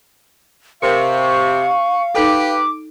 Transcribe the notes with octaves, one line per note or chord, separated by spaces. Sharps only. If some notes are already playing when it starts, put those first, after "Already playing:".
C3 A#4 F5 C6 C#6
D#4 G4 A4 B4 D6